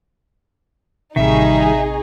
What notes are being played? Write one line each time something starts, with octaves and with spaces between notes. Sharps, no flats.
A1 C3 D#3 G3 D#4 G#4 E5 C#6